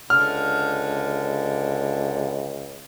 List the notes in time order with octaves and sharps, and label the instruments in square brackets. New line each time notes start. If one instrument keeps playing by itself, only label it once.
[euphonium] C#2 [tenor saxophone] D3 [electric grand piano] F6